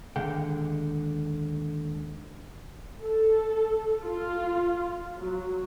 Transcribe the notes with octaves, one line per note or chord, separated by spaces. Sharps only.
D#2 D3 G#3 F5 G5
A4
F4
F#3